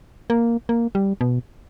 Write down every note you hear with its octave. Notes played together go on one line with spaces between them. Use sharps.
A#3
A#3
G3
B2